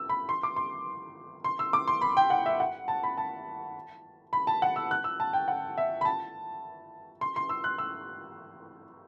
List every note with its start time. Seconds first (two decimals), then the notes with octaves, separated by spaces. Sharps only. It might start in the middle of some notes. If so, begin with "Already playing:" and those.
Already playing: E6
0.09 B5
0.29 C6
0.43 D6
0.56 C6
1.44 C6
1.59 E6
1.73 D6
1.88 C6
2.01 B5
2.17 G5
2.30 F#5
2.46 E5
2.60 F#5
2.88 A5
3.03 B5
3.18 A5
4.33 B5
4.47 A5
4.62 F#5
4.76 E6
4.91 F#6
5.04 E6
5.20 A5
5.33 G5
5.48 F#5
5.78 E5
6.01 B5
6.05 A5
7.21 C6
7.36 C6
7.49 E6
7.64 F#6
7.78 E6